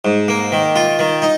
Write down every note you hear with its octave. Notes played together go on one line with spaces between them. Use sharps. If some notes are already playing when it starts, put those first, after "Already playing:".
G#2
A#3
D#3
F4
D#3
D#4